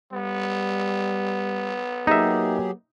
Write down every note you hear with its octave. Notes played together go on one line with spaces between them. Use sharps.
G3 B3
F#3 A#3 D#4 G4 G#4 E5